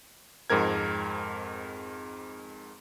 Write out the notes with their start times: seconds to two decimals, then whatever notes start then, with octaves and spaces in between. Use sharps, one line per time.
0.50 F2 G#2 C4 A#4 G#6